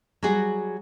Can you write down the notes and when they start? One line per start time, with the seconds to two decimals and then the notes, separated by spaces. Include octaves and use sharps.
0.23 F#3 G3 F#4 G#4